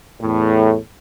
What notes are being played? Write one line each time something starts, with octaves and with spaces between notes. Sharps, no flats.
E2 A2